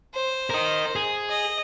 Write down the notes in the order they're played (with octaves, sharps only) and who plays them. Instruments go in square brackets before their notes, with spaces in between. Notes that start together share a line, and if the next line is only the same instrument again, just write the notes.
[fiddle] C5
[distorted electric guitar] A#4 D#5
G#4
[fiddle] D#5